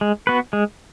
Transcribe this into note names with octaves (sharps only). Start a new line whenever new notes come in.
G#3
B3 F#4 B4
G#3